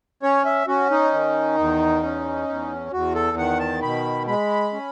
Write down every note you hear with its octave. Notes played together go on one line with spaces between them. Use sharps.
C#4 C#5
E5
C#4 F#4
D#4
D#3
E2
C#4
E2
E2 F#4
A4
D#3 F#5
A5
B2 B5
G#3 B5
C#4